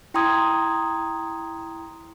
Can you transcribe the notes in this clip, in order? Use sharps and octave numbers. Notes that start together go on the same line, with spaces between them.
E4 G5 A#5 C6 D#6 G#6